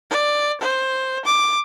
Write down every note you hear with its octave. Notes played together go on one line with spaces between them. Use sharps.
D5
C5
D6